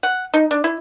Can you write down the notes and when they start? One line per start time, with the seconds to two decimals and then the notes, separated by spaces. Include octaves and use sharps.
0.03 F#5
0.34 D#4
0.51 D4
0.64 E4